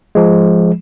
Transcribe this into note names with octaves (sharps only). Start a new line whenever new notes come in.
F3 G#3